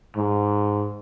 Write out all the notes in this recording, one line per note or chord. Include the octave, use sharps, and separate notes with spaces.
G#2